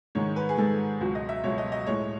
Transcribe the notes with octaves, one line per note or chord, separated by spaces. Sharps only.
G#2 D#3 G#3 C#5
B4
G#4
G#2 D#3 G#3 A4
C#2 B2 F#3 F#4
D#5
E5
C#2 B2 F#3 C#5
D#5
D#5
A2 G#3 C#5